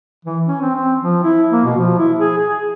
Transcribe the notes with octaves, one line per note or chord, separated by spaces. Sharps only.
E3
C#4
C4
C4
F3
E4
A#3
B2
F3
E4
G#4
G#4